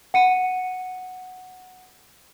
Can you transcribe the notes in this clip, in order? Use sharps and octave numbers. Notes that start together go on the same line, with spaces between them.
F#5 C#7 D#7